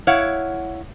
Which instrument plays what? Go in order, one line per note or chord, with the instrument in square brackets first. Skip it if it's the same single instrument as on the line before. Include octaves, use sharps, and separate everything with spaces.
[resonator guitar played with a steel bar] E4 C#5 F5 F#5